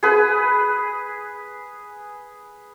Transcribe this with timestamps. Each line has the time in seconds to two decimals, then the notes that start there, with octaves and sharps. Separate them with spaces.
0.03 G#4 B4